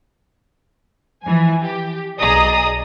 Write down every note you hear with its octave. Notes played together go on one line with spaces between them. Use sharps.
E3 F3 G#5
G4
B1 G#4 D5 D#5 A#5 D#6